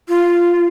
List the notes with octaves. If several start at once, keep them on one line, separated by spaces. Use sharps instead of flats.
F4